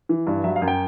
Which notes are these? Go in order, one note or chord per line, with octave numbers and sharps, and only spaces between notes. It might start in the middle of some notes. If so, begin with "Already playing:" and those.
E3
G2
F#3 E5
F5
F#2
G5